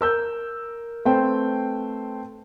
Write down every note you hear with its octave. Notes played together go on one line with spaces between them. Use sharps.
A#4 E6 G6
A3 C4 B4 C5 G5